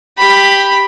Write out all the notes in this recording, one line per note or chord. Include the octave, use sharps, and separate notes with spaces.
G4 B5